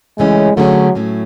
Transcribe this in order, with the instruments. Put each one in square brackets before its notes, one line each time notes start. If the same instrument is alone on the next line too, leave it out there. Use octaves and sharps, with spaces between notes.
[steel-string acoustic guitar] F#2 C#3 E3 A3 C#4 [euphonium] G#3
[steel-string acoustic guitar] D3 A3 C#4 E4 G#4 [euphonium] F#3
[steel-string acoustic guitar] A2 F#3 A3 C#4